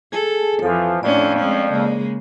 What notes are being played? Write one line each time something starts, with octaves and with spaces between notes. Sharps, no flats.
G#4 A4 G#5 A5
F2 E3 F3 A4
F2 A2 C#4 D4 D5
G#3 C4 C#4
C#3 G#3 A#3